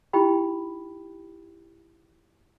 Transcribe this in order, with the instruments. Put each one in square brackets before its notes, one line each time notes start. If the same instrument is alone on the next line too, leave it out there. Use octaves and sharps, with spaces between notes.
[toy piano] D#4 E4 G4 G5 B5